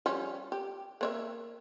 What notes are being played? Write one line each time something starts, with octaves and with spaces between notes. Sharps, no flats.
F3 G3 C#4
G4
A#3 C#5 E5